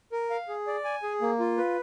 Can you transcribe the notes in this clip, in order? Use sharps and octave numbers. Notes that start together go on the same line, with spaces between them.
A#4
F5
G#4
D5
G#5
G#4
A#3
F4
B4